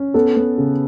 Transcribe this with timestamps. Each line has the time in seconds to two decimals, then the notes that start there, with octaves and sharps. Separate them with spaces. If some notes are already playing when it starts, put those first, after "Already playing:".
Already playing: C#4
0.14 B3 A4
0.37 B3
0.58 C#3